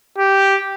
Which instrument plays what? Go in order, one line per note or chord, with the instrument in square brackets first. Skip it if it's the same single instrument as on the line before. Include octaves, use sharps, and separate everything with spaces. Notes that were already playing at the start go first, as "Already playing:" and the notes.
[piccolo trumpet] G4